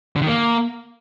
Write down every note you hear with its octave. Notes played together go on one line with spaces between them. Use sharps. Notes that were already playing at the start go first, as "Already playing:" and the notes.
D3
D#3
A#3